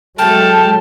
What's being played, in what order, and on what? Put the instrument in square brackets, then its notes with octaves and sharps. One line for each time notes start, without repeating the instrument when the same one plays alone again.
[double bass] F#3 G#3 [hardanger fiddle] A3 A4 [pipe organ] G5 F6 [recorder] A5